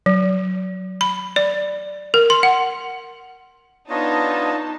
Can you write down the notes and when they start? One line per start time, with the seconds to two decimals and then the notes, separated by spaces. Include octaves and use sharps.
0.06 F#3
1.01 B5
1.36 D5
2.14 A#4
2.30 C6
2.43 F#5
3.90 B3 D4 D#4 F4 C#5 D#5 A5